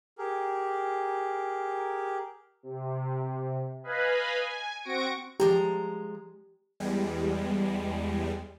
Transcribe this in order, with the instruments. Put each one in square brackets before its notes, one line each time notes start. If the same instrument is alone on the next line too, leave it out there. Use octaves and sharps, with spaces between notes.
[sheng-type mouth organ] G4 G#4 A#4
[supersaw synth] C3
B4 D#5 F5 G#5 B5
G#5
C4 F#4 C#6 A#6 D7
[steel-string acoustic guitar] F3 G#3 A#5 [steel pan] G4
[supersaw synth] E2 G3 G#3